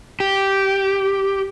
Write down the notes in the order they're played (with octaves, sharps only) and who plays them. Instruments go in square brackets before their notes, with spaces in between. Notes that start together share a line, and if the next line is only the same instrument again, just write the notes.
[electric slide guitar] G4